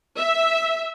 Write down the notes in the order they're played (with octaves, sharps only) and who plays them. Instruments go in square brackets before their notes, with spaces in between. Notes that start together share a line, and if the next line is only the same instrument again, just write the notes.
[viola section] E5